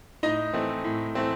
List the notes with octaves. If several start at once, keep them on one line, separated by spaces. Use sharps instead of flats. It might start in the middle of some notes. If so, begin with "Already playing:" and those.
A2 D#4 D#5
E3 A3 C4
A2
E3 A3 C4